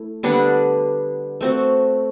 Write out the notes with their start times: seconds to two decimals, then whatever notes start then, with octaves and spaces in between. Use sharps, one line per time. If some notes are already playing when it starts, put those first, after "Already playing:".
Already playing: A3 E4
0.23 D3 G3 B3 D4
1.41 A3 C4 F#4